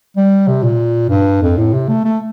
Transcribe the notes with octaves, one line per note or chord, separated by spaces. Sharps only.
G3
C3
A#2
G2
F2
A2
C3
A3
A3